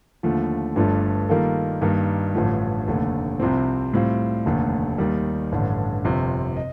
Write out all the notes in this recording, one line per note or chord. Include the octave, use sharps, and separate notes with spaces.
D#2 D3 F3 A3
G1 G2 F3 A3 D4
D#3 G3 A#3 F4 A4
G2 D#3 G3 A#3
A1 G2 D3 F3 A3
F1 D#2 D3 A3
C2 C3 F3 C4
A2 G3 C4 F4
F1 D#2 D3 A3
D#2 D#3 G3
A1 G2 D3
G1 F2 C3
D#5